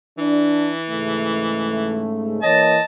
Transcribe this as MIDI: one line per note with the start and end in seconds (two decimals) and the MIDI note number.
0.18 2.12 52
0.18 0.72 62
0.89 2.40 44
0.89 2.40 49
0.89 2.40 57
2.43 2.78 52
2.43 2.78 58
2.43 2.78 73
2.43 2.82 75
2.43 2.82 81